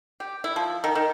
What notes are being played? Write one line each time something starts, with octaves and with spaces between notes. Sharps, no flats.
G4
E4
F3
D#3
D#3